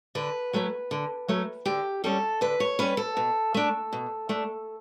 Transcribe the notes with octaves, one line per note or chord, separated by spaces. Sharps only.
D3 B4
F#3 A3 C#4
D3
F#3 A3 C#4
D3 G4
G3 C#4 A4
D3 B4
C#5
G3 C#4 B4
A4
B2
A3 D4
B2
A3 D4